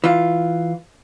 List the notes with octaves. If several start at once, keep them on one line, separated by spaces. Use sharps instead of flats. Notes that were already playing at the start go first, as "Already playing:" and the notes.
E3 F4